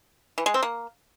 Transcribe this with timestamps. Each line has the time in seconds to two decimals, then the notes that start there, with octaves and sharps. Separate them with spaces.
0.38 E3
0.46 G#3
0.54 C4
0.63 A#3